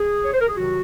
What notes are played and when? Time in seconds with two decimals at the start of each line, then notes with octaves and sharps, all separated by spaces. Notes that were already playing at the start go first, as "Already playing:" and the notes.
Already playing: G#4
0.24 C#5
0.33 C5
0.41 A#4
0.48 G#4
0.57 C3 D#3 F#3 F#4